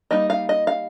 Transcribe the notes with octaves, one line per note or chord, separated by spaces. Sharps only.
G3 A#3 D#4 D#5
F5
D#5
F5